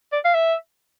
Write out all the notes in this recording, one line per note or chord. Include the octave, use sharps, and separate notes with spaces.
D5
F5
E5